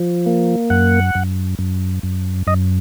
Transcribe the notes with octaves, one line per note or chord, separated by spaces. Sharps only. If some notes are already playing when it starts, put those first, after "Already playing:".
Already playing: F3
A#3
F#2 F#5
F#2
F#2
F#2
F#2 D#5